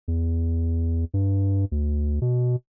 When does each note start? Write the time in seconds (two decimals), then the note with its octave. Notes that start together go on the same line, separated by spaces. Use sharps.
0.08 E2
1.14 G2
1.72 D2
2.22 B2